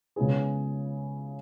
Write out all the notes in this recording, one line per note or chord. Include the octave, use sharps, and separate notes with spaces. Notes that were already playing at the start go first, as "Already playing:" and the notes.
C#3 G#3 B3 E4 G#4